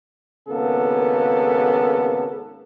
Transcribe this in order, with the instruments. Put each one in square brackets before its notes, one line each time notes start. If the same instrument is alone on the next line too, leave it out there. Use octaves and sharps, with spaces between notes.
[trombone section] G#1 C#3 A#3 B3 A4